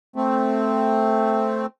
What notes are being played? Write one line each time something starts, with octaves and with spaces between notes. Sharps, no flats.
A3 C4